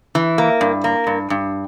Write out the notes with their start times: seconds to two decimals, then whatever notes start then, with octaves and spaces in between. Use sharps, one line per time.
0.15 E3
0.38 A#3
0.61 G2
0.84 A#3
1.07 G2
1.30 G2